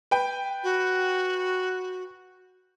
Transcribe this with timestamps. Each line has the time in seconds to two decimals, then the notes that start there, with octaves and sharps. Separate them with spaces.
0.11 B4 G5
0.64 F#4